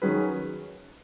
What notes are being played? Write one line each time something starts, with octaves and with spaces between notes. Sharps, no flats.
D#3 F#3 C#4 G#4 B4